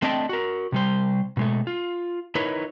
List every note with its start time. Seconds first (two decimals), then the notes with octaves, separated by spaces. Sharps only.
0.02 A3 C4 D4 D#5 G5 A5
0.29 F#4 A#4
0.72 C3 G3 C5
1.37 B2 G#3 A3
1.67 F4
2.35 D#4 E4 A#4 B4 C#5